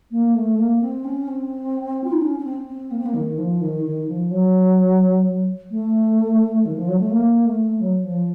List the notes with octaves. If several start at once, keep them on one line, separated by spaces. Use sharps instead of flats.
A#3
A3
A#3
C4
C#4
C4
F4
D#4
C#4
C#4
C4
C4
A#3
C4
A#3
D#3
F3
D#3
D#3
F3
F#3
A3
D#3
F3
F#3
A3
A#3
A3
F#3
F3